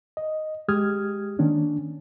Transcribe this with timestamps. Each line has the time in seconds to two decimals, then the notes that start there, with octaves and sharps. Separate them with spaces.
0.17 D#5
0.68 G#3 G4 D#6 F6 G#6
1.39 D#3 A#3 C#4 D4